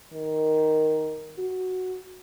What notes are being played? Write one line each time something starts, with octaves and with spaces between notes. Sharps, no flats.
D#3
F#4